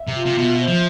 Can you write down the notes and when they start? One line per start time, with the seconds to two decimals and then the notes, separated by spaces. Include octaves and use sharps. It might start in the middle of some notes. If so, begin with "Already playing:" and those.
Already playing: E5
0.08 C3
0.15 F4
0.26 C3
0.38 B2 E5
0.60 C5
0.68 F3